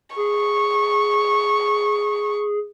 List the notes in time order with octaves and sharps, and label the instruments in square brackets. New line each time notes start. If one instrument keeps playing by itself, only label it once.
[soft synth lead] G#4 [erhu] C#6